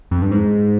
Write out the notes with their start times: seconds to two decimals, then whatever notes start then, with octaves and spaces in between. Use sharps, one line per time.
0.11 F2
0.22 G2
0.31 G#2